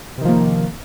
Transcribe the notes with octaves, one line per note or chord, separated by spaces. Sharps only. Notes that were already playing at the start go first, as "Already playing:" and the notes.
C3 D#3 F3 A#3